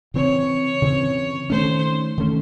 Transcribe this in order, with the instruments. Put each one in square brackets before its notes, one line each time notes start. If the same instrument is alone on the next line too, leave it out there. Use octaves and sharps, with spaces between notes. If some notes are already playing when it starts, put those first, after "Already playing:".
[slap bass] C#3 E3 C4 [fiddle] C#5
[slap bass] C#3 E3 C4
[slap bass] D#3 A3 C#4 [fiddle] C5
[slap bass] D#3 A3 C#4